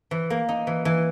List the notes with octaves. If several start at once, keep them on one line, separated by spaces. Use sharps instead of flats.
E3
A#3
D#4
E3
E3